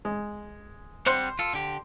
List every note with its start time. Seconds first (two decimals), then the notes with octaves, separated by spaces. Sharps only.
0.05 G#3
1.06 G3 C4 C5 F#5
1.39 F4 A4
1.53 D3 G4